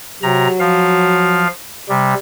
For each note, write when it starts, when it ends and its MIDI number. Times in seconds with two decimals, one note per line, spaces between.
0.22 0.48 48
0.22 1.46 54
0.22 0.48 82
0.59 1.47 53
0.59 1.47 77
1.89 2.14 48
1.89 2.14 55